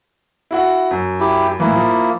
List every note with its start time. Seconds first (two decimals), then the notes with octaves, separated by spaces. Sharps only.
0.51 E4 F#4 F#5
0.91 F#2
1.20 E4 G4
1.60 A2 E3 A#3 E4
1.76 F3